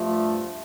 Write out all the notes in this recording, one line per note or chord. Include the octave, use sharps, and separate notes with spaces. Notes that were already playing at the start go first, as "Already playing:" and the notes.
Already playing: G2 F3 A3